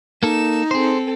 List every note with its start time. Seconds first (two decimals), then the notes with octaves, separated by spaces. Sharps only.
0.23 A#3 D#4 A4 E7
0.71 C4 G#4 A4 C5